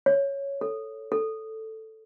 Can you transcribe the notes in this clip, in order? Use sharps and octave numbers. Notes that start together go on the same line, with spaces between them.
C#5
A4
A4